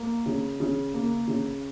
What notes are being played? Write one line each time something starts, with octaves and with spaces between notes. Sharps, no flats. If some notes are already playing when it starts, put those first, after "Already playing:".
Already playing: A#3
C#3
C#3
A#3
C#3